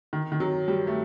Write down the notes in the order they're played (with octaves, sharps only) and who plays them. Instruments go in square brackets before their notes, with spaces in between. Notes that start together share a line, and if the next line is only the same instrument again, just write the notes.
[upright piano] D#3
D#3
F#3
G3
A3